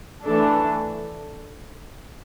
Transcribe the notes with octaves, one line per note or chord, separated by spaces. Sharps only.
E3 A3 D4 A4